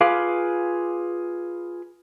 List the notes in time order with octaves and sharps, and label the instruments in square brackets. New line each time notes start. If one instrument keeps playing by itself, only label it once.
[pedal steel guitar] F4 G#4 B4 F5 D6